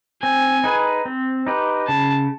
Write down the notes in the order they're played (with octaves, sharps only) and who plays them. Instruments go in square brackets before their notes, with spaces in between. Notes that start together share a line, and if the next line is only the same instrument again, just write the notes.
[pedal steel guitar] C4 [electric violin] G#5
[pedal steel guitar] D#4 G#4 B4
C4
D#4 G4 B4
[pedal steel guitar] C#3 [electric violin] A5